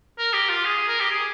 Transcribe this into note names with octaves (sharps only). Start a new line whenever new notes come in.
A#4
G4
F4
G#4
A#4
G4
G#4